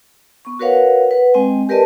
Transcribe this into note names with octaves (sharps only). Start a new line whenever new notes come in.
B3 C#6
F#4 A#4 B4 C#5 F5 F#5
B4 F#5
G#3 C4 D#5 G5 G#5
G4 A#4 B4 D5 D#5 A5